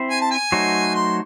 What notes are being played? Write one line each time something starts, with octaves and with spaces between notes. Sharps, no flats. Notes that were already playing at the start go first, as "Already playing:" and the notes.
Already playing: C4 E4 C5
G#5
A5
G#5
F#3 A3 D#4 F#4 C5
C6